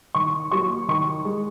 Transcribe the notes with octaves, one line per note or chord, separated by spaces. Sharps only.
D#3 C#6
F#3 A#3 C#6
D#3 C#6
G#3